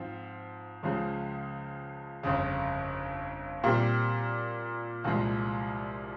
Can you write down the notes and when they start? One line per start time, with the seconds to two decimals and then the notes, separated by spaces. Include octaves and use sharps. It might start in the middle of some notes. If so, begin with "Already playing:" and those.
Already playing: G#2 F3 C4
0.83 C#2 C#3 F3 G#3
2.23 G1 F2 C#3
3.64 A#2 G3 C4
5.04 C2 A#2 F3 G#3